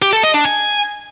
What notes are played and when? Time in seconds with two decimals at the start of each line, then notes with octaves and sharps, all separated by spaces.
0.02 G4
0.13 A4
0.23 D#5
0.34 D4
0.45 G#5